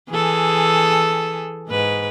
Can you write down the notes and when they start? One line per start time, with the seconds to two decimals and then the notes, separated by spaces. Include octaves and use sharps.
0.10 E3 G#4 A4
1.69 G#2 B4